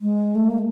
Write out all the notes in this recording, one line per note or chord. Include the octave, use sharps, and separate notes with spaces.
G#3
A3
A#3